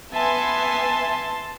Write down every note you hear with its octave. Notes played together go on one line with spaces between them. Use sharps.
B3 E5 G#5 A5 C6